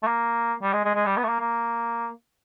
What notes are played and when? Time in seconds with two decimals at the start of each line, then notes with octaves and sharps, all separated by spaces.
0.03 A3
0.07 A#3
0.62 G3
0.73 G#3
0.85 G#3
0.95 G#3
1.06 G3
1.17 B3
1.24 A3
1.29 A#3
1.40 A#3